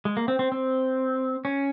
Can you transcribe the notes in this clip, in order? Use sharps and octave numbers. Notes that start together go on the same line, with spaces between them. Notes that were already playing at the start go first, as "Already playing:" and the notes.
G#3
A#3
C4
C4
C4
C#4